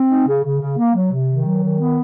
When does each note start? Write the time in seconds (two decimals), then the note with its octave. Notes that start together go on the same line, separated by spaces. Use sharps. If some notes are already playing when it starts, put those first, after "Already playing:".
Already playing: C4
0.10 D#4
0.27 C#3
0.44 C#3
0.60 C#3
0.77 A#3
0.95 F#3
1.12 C3
1.29 D#3
1.45 F#3
1.63 D#3
1.80 B3